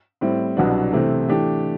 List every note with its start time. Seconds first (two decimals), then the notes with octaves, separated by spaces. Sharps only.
0.21 A2 G3 C4 E4
0.57 C2 B2 F#3 B3 D4
0.93 C3 E3 A3 C4
1.28 E3 A3 D4 G4